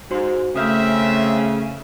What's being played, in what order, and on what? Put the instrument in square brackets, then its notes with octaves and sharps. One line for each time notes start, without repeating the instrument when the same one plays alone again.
[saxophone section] G#2 [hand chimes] F#4 C5 C6
[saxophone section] C#3 [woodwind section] A3 [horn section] C4 E5 [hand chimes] D#6 F6 G6